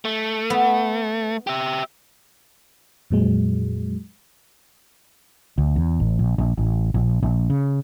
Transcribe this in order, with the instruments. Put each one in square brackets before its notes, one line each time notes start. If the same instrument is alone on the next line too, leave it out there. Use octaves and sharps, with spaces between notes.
[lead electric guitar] A3
[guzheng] B3
[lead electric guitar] G4 E5
[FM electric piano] F2 A#2 F#3 G#3
[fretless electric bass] D2
E2
A1
A#1
A#1
A1
A#1
A#1
C#3